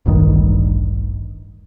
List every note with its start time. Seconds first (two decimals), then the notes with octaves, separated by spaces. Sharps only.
0.06 D1 A1 G2 D#3